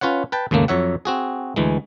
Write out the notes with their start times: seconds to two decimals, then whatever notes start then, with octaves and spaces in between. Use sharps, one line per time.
0.01 C#4 F4 B4 C#5 F#5
0.32 B4 G5 A5
0.51 D#2 G#2 C#3 A3 A#3
0.68 F2 F#3 C#5 E5 F#5
1.05 C4 F#4 G#4
1.56 D2 E3 G#3